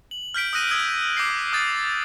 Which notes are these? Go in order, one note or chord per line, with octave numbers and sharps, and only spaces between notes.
F#7
F6 G6 B6 D7
D#6 E6 F#6 A#6 D#7
D#6 E6 G6 G#6
D6 G6 A#6 C7
D#6 G6 A6